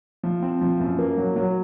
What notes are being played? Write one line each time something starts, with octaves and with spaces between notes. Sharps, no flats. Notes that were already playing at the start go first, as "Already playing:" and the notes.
F3
C4
F3
F#2
A#3
F#3
F#3